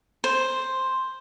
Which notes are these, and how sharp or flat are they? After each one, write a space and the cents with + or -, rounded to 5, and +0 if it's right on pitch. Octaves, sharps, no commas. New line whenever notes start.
C5 +5